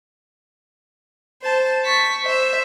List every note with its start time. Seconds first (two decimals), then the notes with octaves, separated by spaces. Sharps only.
1.43 C5 A5
1.85 C#6 B6
2.24 C5 E5